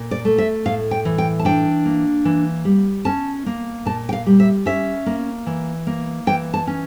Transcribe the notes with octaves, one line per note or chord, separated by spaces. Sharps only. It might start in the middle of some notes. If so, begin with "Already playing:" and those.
Already playing: A#2
D5
A3
E5
A2 F5
G5
E3
G5
A5
D4 G5
A#3
E3
G3
C#4 A5
A#3
A#2 A5
G5
F5
G3
E5
C#4 E5
A#3
E3
A#3
E3 G5
A5
C#4